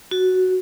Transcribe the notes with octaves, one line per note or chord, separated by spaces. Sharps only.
F#4